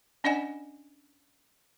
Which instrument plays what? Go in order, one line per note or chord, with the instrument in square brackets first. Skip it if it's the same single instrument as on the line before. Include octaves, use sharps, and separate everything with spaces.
[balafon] C#4 D4 D5 D#5 F#5 G#5